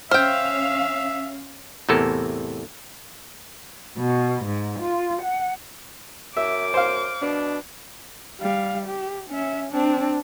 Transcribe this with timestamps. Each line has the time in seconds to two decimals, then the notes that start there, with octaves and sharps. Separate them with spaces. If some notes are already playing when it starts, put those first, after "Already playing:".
0.11 C#4 C5 E5 F5 G5 F6 G6
1.89 E2 A2 C3 A4 A#4
3.98 B2
4.46 G#2
4.80 F4
5.22 F#5
6.37 F#2 E5 D6
6.74 C5 F5
7.22 B2 D4
8.41 G3 F5
8.87 G4
9.30 C#4 E5
9.71 C4 D4